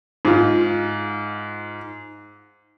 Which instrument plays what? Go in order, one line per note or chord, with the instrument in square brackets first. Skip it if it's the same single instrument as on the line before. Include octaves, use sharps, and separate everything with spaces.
[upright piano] G#2 F4